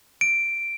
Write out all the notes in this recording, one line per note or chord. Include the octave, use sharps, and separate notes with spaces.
D7